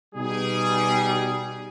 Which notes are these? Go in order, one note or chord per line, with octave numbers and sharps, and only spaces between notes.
B2 G3 D#4 G#4